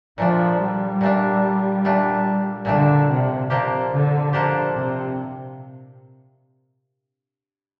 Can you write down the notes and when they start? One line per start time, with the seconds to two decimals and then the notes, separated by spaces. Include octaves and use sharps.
0.18 A#2 F3 A3 D4
0.60 G3
1.01 A#2 A3 D4
1.85 A#2 A3 D4
2.65 A#2 D3 A3 D4
3.08 C3
3.50 C3 F3 A#3 D4 G4
3.92 D3
4.33 F3 A#3 D4 G4
4.75 C3